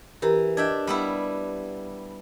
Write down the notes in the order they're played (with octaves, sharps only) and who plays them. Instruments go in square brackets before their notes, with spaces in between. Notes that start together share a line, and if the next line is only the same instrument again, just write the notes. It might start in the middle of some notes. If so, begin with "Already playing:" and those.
[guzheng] E3 [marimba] G4 A#4 A#5
[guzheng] D4 E5 G5 [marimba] D#5 G#6
[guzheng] G3 B3 E4